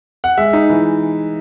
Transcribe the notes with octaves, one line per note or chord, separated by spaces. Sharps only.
F#5
G#3 E5
D#4
E3